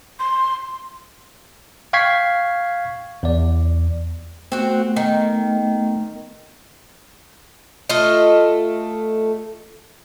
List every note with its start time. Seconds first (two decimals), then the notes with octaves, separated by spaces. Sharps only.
0.19 C6
1.93 F5 G5 C#6 G#6 B6 C7
3.23 E2 D5
4.52 A3 B3 C4 F#4
4.96 D#3
7.89 A3 F4 D#5